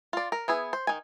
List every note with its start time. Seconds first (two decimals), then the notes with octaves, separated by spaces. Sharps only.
0.13 F4 D5
0.32 A#4
0.48 B3 E4 G#4
0.73 C5
0.87 D#3 G#5